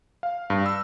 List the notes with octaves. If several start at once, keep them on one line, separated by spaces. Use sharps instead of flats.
F5
G2
E6